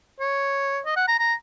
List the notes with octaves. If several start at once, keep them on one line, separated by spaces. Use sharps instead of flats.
C#5
D#5
F#5
A#5
A#5